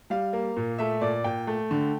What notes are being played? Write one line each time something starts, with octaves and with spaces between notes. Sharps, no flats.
G3 F5
A#3
A#2
A3 E5
A#2 D5
A#2 G5
A3
D3